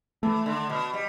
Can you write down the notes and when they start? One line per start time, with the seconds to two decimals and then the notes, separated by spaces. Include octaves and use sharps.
0.23 E3 A3
0.46 D3
0.70 B2
0.94 G3